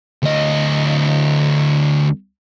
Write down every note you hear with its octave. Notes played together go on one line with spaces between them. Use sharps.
D2 D#5